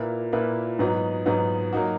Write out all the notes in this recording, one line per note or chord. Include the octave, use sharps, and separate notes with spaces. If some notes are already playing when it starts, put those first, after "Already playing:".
Already playing: A#2 A#3 E4 B4
A#2 A#3 E4 B4
G#2 F#3 B3 D#4
G#2 F#3 B3 D#4
F#3 A#3 D#4 F#4